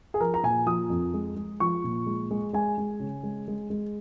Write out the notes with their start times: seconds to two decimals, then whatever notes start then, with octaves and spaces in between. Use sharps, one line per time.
0.14 G#4
0.20 F3 A#4
0.34 A#5
0.43 A#2 G#5
0.66 F3 D#6
0.90 F2
1.14 G#3
1.36 G#3
1.60 F3 C#6
1.84 A#2
2.06 G#3
2.31 G#3
2.53 G#3 G#5
2.78 G#3
3.00 C#3
3.23 G#3
3.48 G#3
3.70 G#3